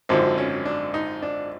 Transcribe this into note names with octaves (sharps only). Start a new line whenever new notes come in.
G#1 F#2 D3 F3 C4
C#4
D4
D#4
D4